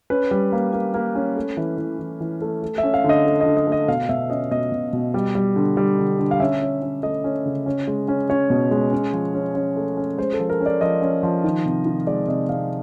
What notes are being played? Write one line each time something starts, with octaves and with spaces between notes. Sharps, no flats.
C#4 B4
G3
A#3
A#3
A#3
C#4
A3
E3
E3
E3
E3
A3
A3
E5
C#4
F5
D3
D#5
A3
D#5
D3
D#5
A3
D#5
B2 F5
B2 E5
C#4 D#5
B2 D#5
B2
B2
G3
G3
D3
G3
D3
D3
F5
C#4 E5
C#4
C#4
A3 D#5
C#4
C#3
C#4
G#3
C#4
C#4 C#5
B2
G#3
C#4
F3
C#4
C#4
A3
C#4
G#3 C5
A4
F3
A#4
C#4
D5
F3 D#5
C#4
F3
D#3
C3
D#3
G#3 D5
C3 D#5
C3 F5